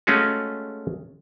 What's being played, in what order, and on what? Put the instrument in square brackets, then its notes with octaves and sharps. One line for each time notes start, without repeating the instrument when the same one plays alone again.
[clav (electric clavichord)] G#3 A3 C#4 F4 F#4